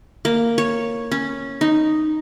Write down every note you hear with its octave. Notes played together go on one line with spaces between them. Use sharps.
A#3
C#5
C#4
D#4